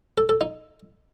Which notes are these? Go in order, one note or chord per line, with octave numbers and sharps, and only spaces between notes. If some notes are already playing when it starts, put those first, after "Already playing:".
A4
A4
D#4